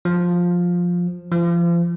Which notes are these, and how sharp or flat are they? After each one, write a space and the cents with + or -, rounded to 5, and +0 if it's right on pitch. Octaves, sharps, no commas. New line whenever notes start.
F3 +10
F3 -35